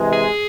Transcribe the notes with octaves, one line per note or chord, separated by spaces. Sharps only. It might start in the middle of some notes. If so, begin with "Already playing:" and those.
Already playing: C3 E3 G#3
G#4